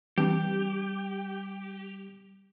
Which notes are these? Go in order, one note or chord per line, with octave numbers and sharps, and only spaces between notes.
E3 G3 C4 D4 G4